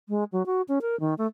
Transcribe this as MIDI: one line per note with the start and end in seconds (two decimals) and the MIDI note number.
0.09 0.24 56
0.32 0.45 54
0.46 0.62 66
0.68 0.79 61
0.82 0.99 70
1.00 1.14 51
1.18 1.27 57